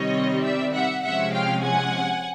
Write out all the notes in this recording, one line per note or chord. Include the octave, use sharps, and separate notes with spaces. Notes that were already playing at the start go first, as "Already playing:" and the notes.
Already playing: C3 D#3 G3 C4 C#5 D#5
D5 E5
E5 F#5
C3 F3 G#3 C#4 E5 F#5
F5 G5
F#5 G#5